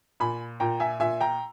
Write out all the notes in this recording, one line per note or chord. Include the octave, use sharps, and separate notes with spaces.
A#2 G#5 B5
A#2 G5 A#5
E5 G#5
A#2 E5 G#5
G5 A#5